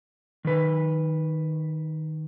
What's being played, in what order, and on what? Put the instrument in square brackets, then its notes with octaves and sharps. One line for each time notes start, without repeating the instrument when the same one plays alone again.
[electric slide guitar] D#3 B4